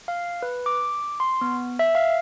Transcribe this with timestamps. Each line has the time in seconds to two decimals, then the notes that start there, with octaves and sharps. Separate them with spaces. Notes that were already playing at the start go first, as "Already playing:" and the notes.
0.08 F5
0.42 B4
0.66 D6
1.20 C6
1.41 B3
1.79 E5
1.95 F5